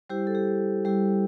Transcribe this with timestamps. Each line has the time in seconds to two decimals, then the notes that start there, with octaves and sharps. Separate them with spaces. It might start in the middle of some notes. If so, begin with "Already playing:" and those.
0.10 G3 E4 G4 C5
0.27 A4
0.35 G4
0.85 G3 E4 G4